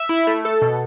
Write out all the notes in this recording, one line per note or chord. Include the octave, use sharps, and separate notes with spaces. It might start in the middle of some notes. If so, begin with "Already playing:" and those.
Already playing: E5
E4
A3
A4
B2